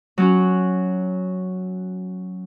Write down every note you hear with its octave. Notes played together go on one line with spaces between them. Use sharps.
F#3 C#4 F#4